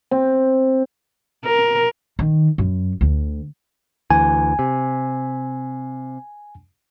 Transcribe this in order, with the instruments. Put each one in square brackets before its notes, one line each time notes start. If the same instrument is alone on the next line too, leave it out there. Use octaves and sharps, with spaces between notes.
[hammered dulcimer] C4
[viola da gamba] A#4
[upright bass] D#3
F#2
D2
[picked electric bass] D2 E3 [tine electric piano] G#5
[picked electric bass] C3